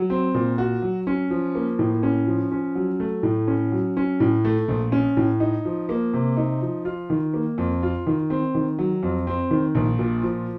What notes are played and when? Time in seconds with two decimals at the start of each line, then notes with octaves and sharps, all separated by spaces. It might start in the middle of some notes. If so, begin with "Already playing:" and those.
Already playing: F#3
0.10 C4
0.35 A#2
0.58 F#4
0.82 F#3
1.07 C#4
1.30 F3
1.55 A#3
1.79 A2
2.03 C#4
2.27 F3
2.51 C#4
2.75 F#3
3.00 A3
3.23 A2
3.48 C#4
3.72 F#3
3.97 C#4
4.20 A2
4.45 A3
4.68 A#1
4.92 C#4
5.17 A2
5.40 D#4
5.65 F3
5.89 A#3
6.14 C3
6.37 D#4
6.62 F3
6.85 F4
7.10 D#3
7.34 A#3
7.58 F2
7.83 F4
8.07 D#3
8.30 C4
8.55 D#3
8.79 F#3
9.03 F2
9.27 C4
9.51 D#3
9.75 A#1
9.99 A#2
10.23 F3